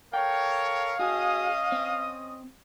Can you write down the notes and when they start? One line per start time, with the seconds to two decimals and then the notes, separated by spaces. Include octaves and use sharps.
0.13 A4 A#4 C#5 F5 G5
0.99 C#4 F#4 G#4 D#5 D#6
1.72 C4